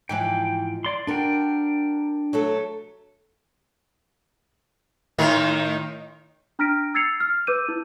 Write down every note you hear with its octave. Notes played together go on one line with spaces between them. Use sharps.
G#2 E3 F3 G5
D5 C6
D4 F#4 A#4 G5
F#3 A3 A4
A2 D#3 A#4
D4 A#5 F6 A#6 B6 D7
E6 G#6 A6 C7 C#7 F7
F6
B4 D6 E6 G6 D#7
E4